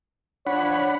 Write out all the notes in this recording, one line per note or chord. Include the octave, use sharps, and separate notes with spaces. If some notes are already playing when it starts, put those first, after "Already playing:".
F3 D4 C#5 F#5 B5